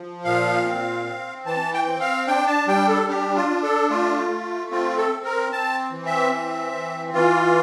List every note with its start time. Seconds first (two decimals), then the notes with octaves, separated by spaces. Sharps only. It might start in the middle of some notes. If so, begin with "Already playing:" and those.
Already playing: F3
0.24 A#2 F5
0.65 C4
1.06 C4
1.46 E3 A5
1.74 G5
1.87 C4
2.00 F5
2.27 D4 G5
2.47 A5
2.67 G3 G5
2.88 A4
3.08 D4 G4
3.36 F4
3.49 D4
3.63 A4
3.90 A3 F4
4.30 A3
4.71 C4 F4
4.97 A4
5.11 C4
5.24 A#4
5.52 C4 A5
5.92 E3
6.06 E5
6.32 C4
6.73 E3
7.13 E3 F4